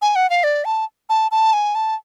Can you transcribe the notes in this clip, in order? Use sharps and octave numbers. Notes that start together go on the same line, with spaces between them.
G#5
F#5
F5
D5
A5
A5
A5
G#5
A5